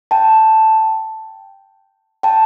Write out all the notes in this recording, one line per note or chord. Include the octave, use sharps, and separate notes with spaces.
G5 A5
G5 A5